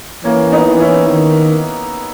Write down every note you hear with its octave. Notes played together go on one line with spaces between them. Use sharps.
E3 A#3 C#4
B3 D#4
E3
C#4 E4
D#3